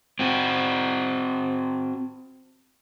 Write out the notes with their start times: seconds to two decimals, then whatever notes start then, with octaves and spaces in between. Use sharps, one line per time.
0.19 C4 F#4